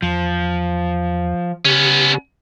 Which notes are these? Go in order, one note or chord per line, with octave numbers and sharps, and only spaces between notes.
E2 F3
C#3 B3 C#4 G4